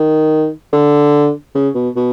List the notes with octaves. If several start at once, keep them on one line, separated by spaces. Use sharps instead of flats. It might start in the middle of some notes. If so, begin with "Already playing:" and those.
Already playing: D#3
D3
C#3
B2
B2